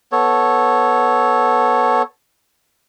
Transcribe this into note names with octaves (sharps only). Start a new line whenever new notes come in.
B3 A4 C#5